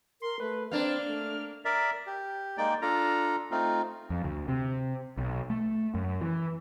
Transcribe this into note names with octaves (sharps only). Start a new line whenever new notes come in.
A#4 C6
A3 B4
A#3 C4 D4 F6
A3
A#4 D5 E5
G4
G#3 A#3 D#4 D5 G5
D4 F4 A4 A#5
A3 C4 D#4 F4
F2
D2
C3
B1
A3
F#2
E3